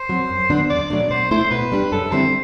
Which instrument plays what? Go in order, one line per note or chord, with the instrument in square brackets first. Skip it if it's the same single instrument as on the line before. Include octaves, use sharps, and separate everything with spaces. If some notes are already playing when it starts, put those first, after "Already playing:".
Already playing: [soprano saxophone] C5
[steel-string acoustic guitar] F#3 C4
F#2
D3 F#3 B3 D4
[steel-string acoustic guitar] E2 [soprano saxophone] D5
[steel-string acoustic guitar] B2 F#3 A3 D4
[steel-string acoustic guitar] B2 [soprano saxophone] C5
[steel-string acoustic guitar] A3 E4 A4 [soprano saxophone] C5
[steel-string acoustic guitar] B2 [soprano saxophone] B4
[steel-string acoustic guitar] G3 D4 G4
[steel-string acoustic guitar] F#2 [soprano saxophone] A4
[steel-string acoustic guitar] D3 G3 C4 E4 [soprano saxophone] C5